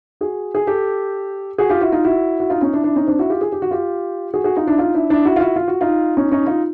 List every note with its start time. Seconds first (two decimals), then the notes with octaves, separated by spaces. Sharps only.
0.21 F#4 G#4
0.55 G#4
0.67 G4 A4
1.58 F#4 G#4
1.70 F4 G4
1.81 E4 F#4
1.92 D#4 F4
2.05 E4 F#4
2.40 F#4
2.50 D#4 F4
2.61 C#4 D#4
2.74 D4 E4
2.84 D4 E4
2.96 C#4 D#4
3.07 C4 D4
3.19 E4 F#4
3.30 F4 G4
3.41 G#4
3.52 G4
3.62 F#4
3.71 F4 G4
4.34 F#4 G#4
4.44 F#4 G#4
4.57 D#4 F4
4.67 D4 E4
4.79 D#4 F4
4.94 D4 E4
5.10 D4 E4
5.25 E4 F#4
5.36 F4
5.40 E4 F#4
5.56 F4
5.68 F#4
5.81 D#4 F4
6.17 C#4 D#4
6.31 C#4 D#4
6.47 D#4 F4